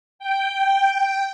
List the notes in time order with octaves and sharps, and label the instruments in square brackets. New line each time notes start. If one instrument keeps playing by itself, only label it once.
[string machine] G5